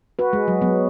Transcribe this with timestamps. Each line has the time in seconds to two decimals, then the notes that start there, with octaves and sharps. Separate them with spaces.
0.19 F#4 B4
0.33 G#3
0.48 F#3
0.62 F#3 B3